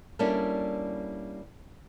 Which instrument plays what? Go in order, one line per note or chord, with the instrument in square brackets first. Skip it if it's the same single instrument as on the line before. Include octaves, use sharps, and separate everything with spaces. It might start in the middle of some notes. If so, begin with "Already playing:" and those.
[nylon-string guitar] G3 A#3 C#4 D4 E4 A4